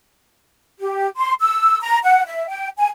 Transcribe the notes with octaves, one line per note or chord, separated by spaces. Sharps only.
G4
C6
E6
A#5
F#5
E5
G5
G#5